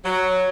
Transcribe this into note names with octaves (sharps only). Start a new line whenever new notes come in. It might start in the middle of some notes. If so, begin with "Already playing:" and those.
F#3